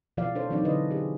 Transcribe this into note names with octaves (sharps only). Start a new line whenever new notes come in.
B2 F3 E4 D5 F5
D4 A4 C5 C#5
E3 F#3 C4 D4 D#4 D5
D3 D4 E4 B4 D#5
G4 G#4